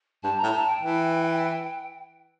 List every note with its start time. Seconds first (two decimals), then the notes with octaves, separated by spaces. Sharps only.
0.23 G2 A5
0.37 A#5
0.43 A2
0.53 A5
0.67 G5
0.82 E3